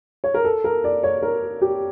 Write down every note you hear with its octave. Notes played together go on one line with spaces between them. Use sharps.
C#5
A#4
A4
A#4
D5
C#5
A#4
G4